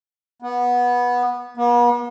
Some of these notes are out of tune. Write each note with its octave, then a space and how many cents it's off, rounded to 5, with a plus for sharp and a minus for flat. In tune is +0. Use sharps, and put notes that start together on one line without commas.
B3 -15
B3 -45